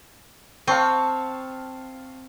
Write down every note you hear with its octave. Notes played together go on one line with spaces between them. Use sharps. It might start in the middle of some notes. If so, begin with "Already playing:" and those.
C4 F5 A5 C#6